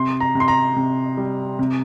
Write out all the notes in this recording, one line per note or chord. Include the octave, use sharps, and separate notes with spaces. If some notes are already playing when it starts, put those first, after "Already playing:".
Already playing: C3 C6
A#5
C3
C6
A#5
C3
G3
C3